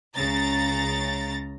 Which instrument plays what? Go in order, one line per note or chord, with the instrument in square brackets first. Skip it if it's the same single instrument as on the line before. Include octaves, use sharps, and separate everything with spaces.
[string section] C#2 C#3 A#5 A6